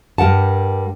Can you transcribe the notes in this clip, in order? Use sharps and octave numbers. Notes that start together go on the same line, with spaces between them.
G2 G3 A#4 F#5 A5